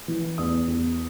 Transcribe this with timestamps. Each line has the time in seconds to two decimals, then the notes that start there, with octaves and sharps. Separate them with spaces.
0.08 E3
0.38 E2 D#6
0.68 E2